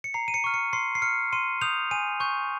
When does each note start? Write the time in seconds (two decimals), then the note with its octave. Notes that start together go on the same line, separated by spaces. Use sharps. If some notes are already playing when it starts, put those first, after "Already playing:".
0.04 C#7
0.14 A#5 C7
0.28 D#7
0.34 C#7
0.44 C#6 F6
0.54 C#7
0.73 C6 C7
0.95 C7
1.02 F6 C#7
1.33 C6 D#7
1.61 D#6 G6 F7
1.91 G#5 D#7
2.20 C#6 G6